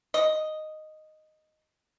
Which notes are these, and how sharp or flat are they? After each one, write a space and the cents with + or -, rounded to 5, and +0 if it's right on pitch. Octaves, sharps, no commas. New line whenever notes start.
D#5 -5